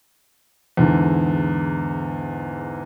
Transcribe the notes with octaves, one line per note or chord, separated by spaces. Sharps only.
E2 G#2 D3